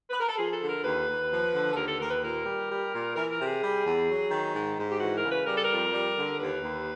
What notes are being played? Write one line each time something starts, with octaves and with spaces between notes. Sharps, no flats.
B4
A#4
A4
F3 G#4
A4
D3
A#4
D#2 B4
D#2
F3
D3
A4
D#2 A#4
A4
D#2 A#4
B4
A#2 A#4
G3
G3
A#2
E3 A#4
A#4
C3
G#4
G3
E2
F#3
D#3
G#2
G#2
G4
E3 F#4
A#4
C#3
B4
G3 A#4
A4
F2 A#4
G3
D3
D#2 B4
D#2